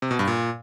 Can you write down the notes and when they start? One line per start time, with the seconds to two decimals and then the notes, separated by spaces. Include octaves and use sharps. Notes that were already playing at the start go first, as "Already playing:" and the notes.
0.02 C3
0.11 B2
0.19 G2
0.28 A#2